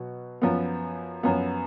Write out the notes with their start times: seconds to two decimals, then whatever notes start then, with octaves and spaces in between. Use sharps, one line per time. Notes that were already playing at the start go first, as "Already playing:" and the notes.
Already playing: B2 F#3 B3
0.42 F#2 F3 B3
1.23 F#2 F3 B3